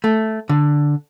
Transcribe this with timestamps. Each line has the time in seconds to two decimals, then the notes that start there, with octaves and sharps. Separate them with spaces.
0.04 A3
0.49 D3